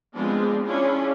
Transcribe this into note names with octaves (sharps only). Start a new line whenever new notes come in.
F3 G#3 B3 C4 D4 F4
C#4 D4 E4 F4 G#4